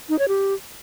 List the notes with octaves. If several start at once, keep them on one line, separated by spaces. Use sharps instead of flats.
D#4
C#5
G4